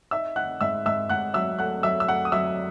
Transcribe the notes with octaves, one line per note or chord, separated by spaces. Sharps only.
D#4 E5 E6
D#4 F#5 F#6
G#2 E5 E6
G#2 E5 E6
G#2 F#5 F#6
F#3 E5 E6
A3 F#5 F#6
F#3 E5 E6
E6
A3 F#5 F#6
D#6
F#3 E5 E6